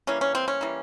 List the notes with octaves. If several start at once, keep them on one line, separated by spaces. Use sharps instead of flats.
E3 G3 A#3 C#4
C#4
C4
C#4
E3 G3 A#3